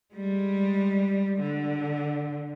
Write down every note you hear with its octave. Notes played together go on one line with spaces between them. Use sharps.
G3 G#3
D3